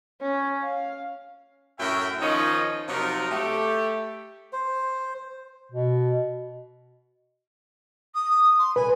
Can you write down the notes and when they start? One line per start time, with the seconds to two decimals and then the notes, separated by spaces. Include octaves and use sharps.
0.22 C#4
0.62 F5
1.79 F#2 A2 F#3 A#4 E5 G5
2.21 D#3 F3 C#4 D#4 C#5 D#5
2.89 C3 F3 F#3 D#4 F4 A#4
3.31 A3 G4
4.53 C5
5.72 B2
8.15 D#6
8.59 C6
8.76 B4 G#5